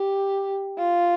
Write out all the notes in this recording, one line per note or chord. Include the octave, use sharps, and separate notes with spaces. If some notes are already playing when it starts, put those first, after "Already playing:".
Already playing: G4
F4